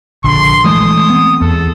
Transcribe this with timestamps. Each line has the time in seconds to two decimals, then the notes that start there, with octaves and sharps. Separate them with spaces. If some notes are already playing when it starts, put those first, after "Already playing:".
0.24 A#1 D3 C6
0.64 E3 G#3 A3 D#6
1.10 B3 C4
1.41 E2 A4